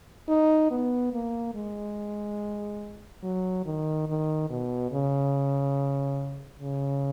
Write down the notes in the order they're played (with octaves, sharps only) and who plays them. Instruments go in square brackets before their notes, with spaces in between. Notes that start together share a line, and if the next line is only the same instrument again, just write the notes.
[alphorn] D#4
B3
A#3
G#3
F#3
D#3
D#3
B2
C#3
C#3